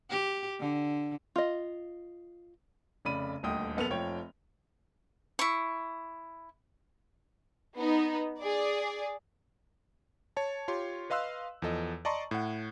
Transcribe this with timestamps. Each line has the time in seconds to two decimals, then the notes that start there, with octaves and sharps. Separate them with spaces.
0.10 G4
0.60 D3
1.36 F4 D#5
3.05 F1 C#3 D5 B5 D#7
3.43 D#1 D2 D#5 G5 D#6
3.77 F#1 B3 A4 F7
3.90 F1 F3 C#5 G5
5.39 E4 C#6
7.77 B3 D#4
8.39 G#4 D5
10.37 C#5 A5
10.68 F4 G4 C#5 C6
11.10 B4 D#5 F5 C6 E6 F#6
11.62 E2 F3 A4 D#5
12.05 D5 D#5 A5 A#5 C6 C#6
12.31 A2 F#5